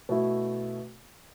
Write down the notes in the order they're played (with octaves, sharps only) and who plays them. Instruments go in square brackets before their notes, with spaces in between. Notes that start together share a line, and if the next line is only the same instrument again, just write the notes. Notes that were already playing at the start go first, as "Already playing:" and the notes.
[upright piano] B2 A3 E4